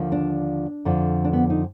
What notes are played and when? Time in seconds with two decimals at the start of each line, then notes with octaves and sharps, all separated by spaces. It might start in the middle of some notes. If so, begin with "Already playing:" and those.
Already playing: D#2 D3 F3
0.12 D4
0.85 F2 D3 F3
1.24 D4
1.33 B3
1.50 D#4